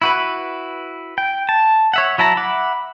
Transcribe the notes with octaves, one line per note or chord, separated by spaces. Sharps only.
E4 F#4 B4
G5
A5
C#5 E5 F#5
F#3 E4 A5 A#5
E5 F#5 B5 D6